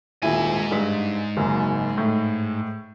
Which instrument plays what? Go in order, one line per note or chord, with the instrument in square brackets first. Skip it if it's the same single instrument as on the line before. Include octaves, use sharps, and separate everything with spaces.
[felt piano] D#1 E4 [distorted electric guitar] G#2 G#5
[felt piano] G2 G#3 B6
F#1 F#2
A2